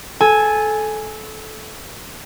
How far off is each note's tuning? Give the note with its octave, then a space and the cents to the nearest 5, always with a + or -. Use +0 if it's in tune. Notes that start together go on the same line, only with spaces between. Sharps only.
A4 -20 G#5 +0